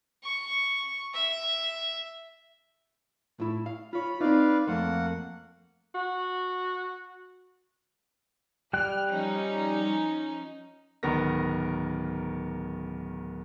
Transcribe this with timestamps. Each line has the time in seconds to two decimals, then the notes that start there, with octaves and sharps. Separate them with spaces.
0.24 C#6
1.14 E5
3.40 A2 E4
3.66 F5
3.93 F4 C#5 B5
4.20 C4 D#4 B4 D5 F5
4.67 F2 A3 A#3 C5 F#5
5.95 F#4
8.73 G3 G5 F6 F#6
9.10 F3 C#4 D#4
11.03 D1 D#3 B3 A#4 A#6